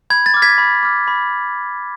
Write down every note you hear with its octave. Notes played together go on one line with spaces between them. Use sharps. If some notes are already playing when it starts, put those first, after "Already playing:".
B5 G#6
A6
D6 F6
G#6 B6
B5
D6 F6
B5